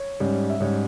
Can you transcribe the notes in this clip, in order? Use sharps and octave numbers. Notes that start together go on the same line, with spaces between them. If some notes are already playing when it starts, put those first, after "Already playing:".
Already playing: C#5
G#2 G3 C#4
E5
G#2 G3 C#4 C#5